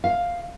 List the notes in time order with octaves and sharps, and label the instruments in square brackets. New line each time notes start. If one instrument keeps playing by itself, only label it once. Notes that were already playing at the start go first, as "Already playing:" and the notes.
[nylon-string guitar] F5